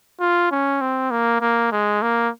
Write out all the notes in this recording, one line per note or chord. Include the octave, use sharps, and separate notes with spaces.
F4
C#4
C4
A#3
A#3
G#3
A#3